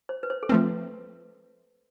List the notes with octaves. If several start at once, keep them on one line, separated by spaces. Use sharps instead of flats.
C5
B4
C5
A4
F3 A3 C4 B4